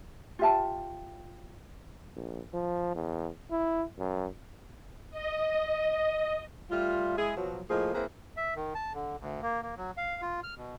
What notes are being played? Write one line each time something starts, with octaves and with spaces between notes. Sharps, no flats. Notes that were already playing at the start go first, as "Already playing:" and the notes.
F4 G4 E5 A5
A#1
F3
E2
E4
F#2
D#5
G3 A3 F4
G#3 E4 G#4
B2 F3 F#3
A2 F3 A#3 G#4 D#5
A#3 C4 E4 G#4 B4
E5
D#3
A5
D3
D2
A#3
A#3
F#3
F5
F4
F6
B2